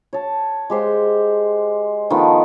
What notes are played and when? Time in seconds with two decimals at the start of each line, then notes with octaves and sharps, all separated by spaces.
0.13 C#5 A5
0.70 G#3 G4 C5 F#5
2.10 D#3 F3 A3 B3